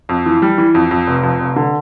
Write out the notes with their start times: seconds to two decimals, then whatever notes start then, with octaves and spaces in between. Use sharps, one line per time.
0.09 F2
0.26 E3
0.42 G3
0.58 E3
0.75 F2
0.91 F2
1.07 F1
1.23 F2
1.40 F1
1.56 D3